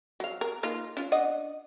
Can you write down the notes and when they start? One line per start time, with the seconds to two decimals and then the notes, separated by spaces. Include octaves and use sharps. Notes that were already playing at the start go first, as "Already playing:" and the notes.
0.20 F#3 F5
0.41 A#4
0.63 A#3 D#4 F4
0.97 C#4 F4
1.12 D4 D#5 F#5